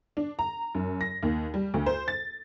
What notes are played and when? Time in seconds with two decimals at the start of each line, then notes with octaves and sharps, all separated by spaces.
0.17 D4
0.39 A#5
0.75 F#2
1.01 A#6
1.23 D#2
1.54 G3
1.74 D2
1.86 C5
2.08 A6